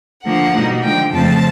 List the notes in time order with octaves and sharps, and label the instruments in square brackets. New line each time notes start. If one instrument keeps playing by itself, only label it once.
[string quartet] D3 F3 A#3 F#5
B2 G3 A#3 D#4
D3 F3 G#3 G5
F2 C#3 F3 A3 C4 A5